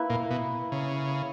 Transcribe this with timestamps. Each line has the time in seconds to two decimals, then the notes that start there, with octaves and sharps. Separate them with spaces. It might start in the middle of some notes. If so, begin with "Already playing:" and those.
Already playing: A#3 E4 B4 E5
0.10 A#2
0.31 B2
0.72 C#3